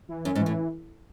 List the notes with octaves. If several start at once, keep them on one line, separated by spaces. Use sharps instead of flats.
E3
F#2 C#4
G#2
E3
A2